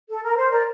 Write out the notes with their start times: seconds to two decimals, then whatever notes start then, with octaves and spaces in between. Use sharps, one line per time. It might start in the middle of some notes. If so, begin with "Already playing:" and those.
0.10 A4
0.23 A#4
0.36 C5
0.50 A#4 D5